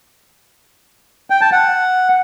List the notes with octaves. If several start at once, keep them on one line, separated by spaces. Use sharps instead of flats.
G5
A5
F#5